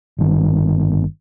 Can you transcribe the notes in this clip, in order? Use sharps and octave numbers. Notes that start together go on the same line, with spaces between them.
G1 D#3